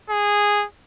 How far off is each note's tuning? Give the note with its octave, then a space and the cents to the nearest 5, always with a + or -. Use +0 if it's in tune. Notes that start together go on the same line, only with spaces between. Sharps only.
G#4 -10